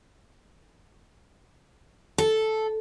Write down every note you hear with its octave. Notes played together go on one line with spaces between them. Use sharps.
A4